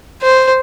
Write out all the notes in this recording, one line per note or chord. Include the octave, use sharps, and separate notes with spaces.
C5